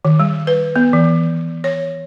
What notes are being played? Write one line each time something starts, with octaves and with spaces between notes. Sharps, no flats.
D#3
G3
B4
B3
E3
C#5